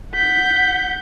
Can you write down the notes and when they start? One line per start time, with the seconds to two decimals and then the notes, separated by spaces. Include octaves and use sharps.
0.13 F#5 G6 B6